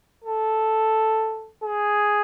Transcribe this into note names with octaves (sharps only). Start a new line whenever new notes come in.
A4
G#4